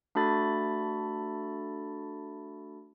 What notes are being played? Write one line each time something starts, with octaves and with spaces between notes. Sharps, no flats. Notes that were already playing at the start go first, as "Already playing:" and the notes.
A3 D4 F#4 A4 B5 A6